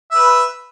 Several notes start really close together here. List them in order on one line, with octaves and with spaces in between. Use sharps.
E5 B4 B5